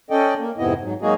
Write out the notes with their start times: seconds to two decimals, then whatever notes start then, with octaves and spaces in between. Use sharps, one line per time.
0.11 C#4 A4 D5 D#5 G5
0.39 A#3
0.58 F2 G#2 C3 B3 E4 D#5
0.81 G#2 F#3
1.02 F#3 G#3 A#3 D#4 F#4 G#4